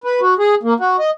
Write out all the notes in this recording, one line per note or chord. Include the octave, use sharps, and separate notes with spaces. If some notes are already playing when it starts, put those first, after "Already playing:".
B4
F#4
G#4
A#3
F#4
D#5